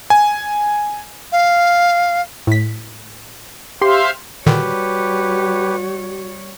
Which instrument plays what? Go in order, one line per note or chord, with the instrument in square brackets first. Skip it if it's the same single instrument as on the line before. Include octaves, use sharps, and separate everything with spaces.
[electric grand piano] G#5
[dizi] F5
[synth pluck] A2 B6
[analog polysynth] G4 C6 [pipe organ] C5 E5 F5
[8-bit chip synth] A#2 D3 D#3 [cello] G3 C#5 [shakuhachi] F#4 [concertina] G4 B4